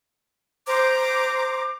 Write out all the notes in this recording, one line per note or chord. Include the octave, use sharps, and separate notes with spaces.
C5 A#5 D6